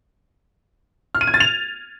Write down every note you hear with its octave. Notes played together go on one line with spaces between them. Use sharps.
F6
D#7
G#6
A6
F7